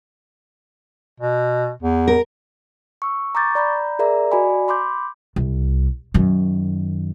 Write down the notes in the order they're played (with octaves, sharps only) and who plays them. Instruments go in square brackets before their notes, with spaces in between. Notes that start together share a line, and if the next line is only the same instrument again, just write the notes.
[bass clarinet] B2
E2
[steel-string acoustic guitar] A#4
[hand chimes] C#6 E6
A#5 C#6 D6 G6 A6
D5 A#5 B5 G6
G#4 A#4 D5 E5 A#5
F#4 D5 D#5 G#5 B5
B5 C6 D6 G6
[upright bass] C2
F#2 D#3